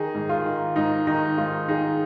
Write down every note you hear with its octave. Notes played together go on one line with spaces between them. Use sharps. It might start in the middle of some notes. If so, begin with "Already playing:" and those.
Already playing: D#3 D#4 G#4
G#2
F4
D#3
G#2 D#4
D#3 D#4
G#2 F4
D#3 D#4 G#4